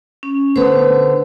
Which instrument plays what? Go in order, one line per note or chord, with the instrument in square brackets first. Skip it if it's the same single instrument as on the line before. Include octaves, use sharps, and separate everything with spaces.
[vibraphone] C#4
[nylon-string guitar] D3 B3 [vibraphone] C5